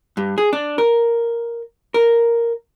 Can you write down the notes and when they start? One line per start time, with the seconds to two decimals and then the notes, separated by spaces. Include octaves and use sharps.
0.17 G2
0.38 G#4
0.53 D4
0.78 A#4
1.94 A#4